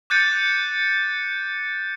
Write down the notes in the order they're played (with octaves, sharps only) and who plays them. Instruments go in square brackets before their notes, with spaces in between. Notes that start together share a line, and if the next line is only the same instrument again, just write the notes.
[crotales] D6 F#6 G6 A6 C#7 D#7